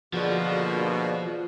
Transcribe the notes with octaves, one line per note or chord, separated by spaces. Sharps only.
B2 D3 F3 A#3 F#4 G#4 D5